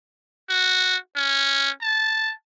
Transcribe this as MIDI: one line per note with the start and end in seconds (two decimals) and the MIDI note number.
0.49 0.96 66
1.16 1.70 61
1.82 2.32 81